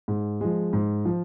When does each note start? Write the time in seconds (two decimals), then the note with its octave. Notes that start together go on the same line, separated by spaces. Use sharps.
0.08 G#2
0.41 F3 G#3
0.73 G#2
1.06 F3